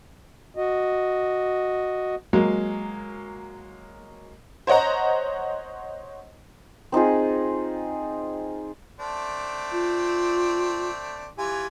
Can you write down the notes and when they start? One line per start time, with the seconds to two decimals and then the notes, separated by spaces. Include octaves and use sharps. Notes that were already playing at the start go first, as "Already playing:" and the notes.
0.57 F#4 D#5
2.33 F#3 G#3 A#3
4.67 C5 C#5 D#5 F#5 A#5
6.92 C4 D#4 F4 G#4
9.00 A3 C4 D4
9.72 F4
11.38 E3 F4 G4 G#5